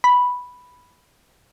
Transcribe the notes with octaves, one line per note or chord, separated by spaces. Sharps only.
B5